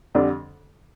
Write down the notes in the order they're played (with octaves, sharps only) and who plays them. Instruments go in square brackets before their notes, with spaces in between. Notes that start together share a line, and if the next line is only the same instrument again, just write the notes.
[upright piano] F2 D3 G3 D4